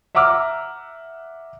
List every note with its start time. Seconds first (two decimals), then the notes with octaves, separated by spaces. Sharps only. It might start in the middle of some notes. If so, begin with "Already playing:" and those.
0.15 E5 F#5 A#5 D6 E6 F6